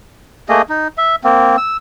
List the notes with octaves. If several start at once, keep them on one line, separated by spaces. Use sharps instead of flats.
A3 A#3 G#4 D#5
D#4
E5
A#3 C4
E6